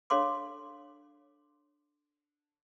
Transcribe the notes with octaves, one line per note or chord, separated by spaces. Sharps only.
D4 A4 C#5 F5 C6 D6